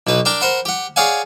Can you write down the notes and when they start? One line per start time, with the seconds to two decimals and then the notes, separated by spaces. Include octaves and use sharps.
0.07 B1 B2 B4
0.25 D4 A#4 G5 D6
0.41 A#4 C5 F#5 B5
0.65 G4 F#5
0.96 G#4 C#5 D5 F5 F#5 G#5